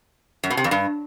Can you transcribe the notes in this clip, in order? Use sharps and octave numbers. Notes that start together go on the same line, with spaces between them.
F#2
B2
C3
F2
G2